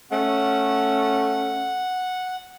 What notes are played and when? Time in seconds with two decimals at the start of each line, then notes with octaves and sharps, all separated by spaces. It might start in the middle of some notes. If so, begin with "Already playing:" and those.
0.11 A3 C#4 F#5